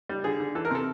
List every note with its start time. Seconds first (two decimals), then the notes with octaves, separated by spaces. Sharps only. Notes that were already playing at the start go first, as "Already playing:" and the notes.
0.09 G3
0.24 D3 G#4
0.40 D3
0.55 E3 A4
0.65 A#4
0.71 C3 A4